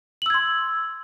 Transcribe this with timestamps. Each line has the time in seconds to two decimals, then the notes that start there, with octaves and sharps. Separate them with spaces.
0.22 F#7
0.26 E6
0.30 G#6
0.34 C6